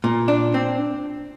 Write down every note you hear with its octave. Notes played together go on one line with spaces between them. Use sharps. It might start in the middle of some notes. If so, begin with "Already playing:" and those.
A#2
D4
C4